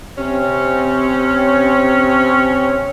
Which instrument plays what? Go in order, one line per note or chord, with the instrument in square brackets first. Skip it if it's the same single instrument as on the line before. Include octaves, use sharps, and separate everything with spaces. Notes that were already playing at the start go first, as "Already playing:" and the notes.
[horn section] C3 C4 C#4